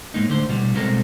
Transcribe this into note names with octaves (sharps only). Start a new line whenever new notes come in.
A2 G#3 A#3 D#4
D3 A3 C5
B2 G3
B2 G3 G#3 C4 A4 A#4